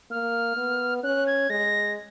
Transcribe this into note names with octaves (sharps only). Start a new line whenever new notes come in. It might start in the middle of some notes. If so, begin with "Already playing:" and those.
A#3 F6
B3
C#4 F#6
G#6
G#3 A#6